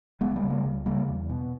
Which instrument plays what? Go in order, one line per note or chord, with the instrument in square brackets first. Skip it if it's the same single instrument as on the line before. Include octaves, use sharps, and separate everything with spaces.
[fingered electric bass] C#2 G#3 B3
G3 A#3
C#3
G3 A#3
C#2
C#3 G3 A#3
E2
B2